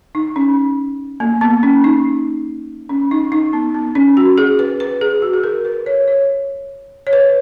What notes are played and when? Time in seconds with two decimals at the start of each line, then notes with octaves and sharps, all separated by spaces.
0.15 D#4
0.36 C#4
1.20 A#3
1.41 B3
1.63 C#4
1.84 D#4
2.89 C#4
3.11 D#4
3.32 D#4
3.53 B3
3.74 B3
3.95 C#4
4.17 F#4
4.38 G#4
4.59 B4
4.80 B4
5.01 G#4
5.22 F#4
5.33 G#4
5.44 A#4
5.65 B4
5.86 C#5
6.08 C#5
7.07 C#5
7.13 B4